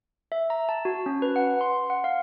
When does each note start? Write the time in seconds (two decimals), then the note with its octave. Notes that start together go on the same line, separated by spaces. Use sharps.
0.32 E5
0.50 A#5
0.69 A5
0.85 F#4
1.06 C#4
1.22 B4
1.36 F#5
1.61 C6
1.90 F#5
2.04 F5